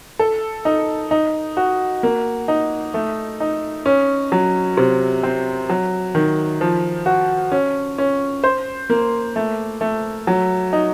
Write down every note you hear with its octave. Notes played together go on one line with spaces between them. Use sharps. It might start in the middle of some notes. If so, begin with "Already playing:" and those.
A4
D#4
D#4
F#4
A#3
D#4
A3
D#4
C#4
F#3
C3
C4
F#3
D#3
F3
F#4
C#4
C#4
C5
A#3
A3
A3
F#3
D#4